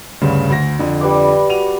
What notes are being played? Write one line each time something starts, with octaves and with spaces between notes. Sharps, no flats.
D2 G2 C#3
D2 A#6
F2 D3
G3 B4 D6
F#4 D#7 F7